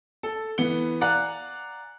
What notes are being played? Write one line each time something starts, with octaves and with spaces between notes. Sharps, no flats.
A4
E3 B3 C#7 G7
D5 F5 F#5 G#5 A#5 F#6